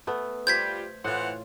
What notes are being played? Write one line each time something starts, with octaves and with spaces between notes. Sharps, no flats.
A3 B3
G3 F4 C5 G6 G#6 B6
A2 E3 F4 C5 F#5